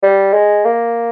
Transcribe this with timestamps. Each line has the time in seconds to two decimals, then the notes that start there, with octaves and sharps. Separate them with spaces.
0.03 G3
0.34 G#3
0.65 A#3